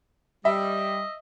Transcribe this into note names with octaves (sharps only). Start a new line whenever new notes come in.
G3 D#5 E5